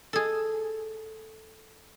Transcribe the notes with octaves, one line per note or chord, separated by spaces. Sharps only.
G#4 A4